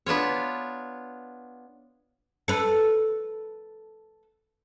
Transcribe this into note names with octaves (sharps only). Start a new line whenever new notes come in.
B3 D4 F4 C#5
A4 B4